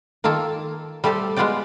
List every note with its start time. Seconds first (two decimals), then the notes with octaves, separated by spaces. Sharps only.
0.24 D#3 A#3 F4 A4
1.04 G3 A3 G4 A4 C5
1.36 G#3 B3 F4 F#4 D5 G5